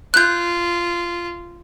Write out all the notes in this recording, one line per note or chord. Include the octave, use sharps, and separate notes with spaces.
F4 F#6 G6